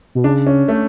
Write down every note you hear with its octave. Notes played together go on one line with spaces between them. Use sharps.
B2
C#3 D4
C#4
A3